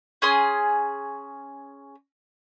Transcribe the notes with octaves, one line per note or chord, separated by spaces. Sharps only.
C#4 G#4 C6